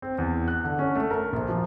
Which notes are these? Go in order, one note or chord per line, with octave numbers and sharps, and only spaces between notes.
C4
E2
F#6
D3
C#4
A3
A#4
A#1
F3